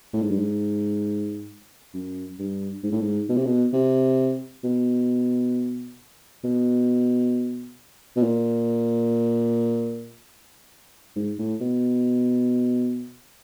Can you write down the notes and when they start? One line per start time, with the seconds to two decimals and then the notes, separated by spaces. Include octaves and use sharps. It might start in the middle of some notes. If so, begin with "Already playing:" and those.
0.13 A2
0.22 G#2
0.31 G2
0.39 G#2
1.94 F#2
2.39 G2
2.84 G#2
2.92 A2
3.01 G#2
3.29 B2
3.37 C3
3.46 B2
3.73 C3
4.64 B2
6.44 B2
8.16 B2
8.23 A#2
11.16 G#2
11.39 A2
11.61 B2